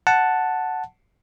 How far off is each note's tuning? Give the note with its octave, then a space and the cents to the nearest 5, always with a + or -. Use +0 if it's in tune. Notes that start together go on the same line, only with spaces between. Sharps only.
F#5 +0 A5 +0